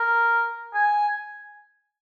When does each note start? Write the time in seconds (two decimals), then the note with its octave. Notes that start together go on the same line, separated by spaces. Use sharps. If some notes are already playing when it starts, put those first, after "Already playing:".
Already playing: A#4
0.73 G#5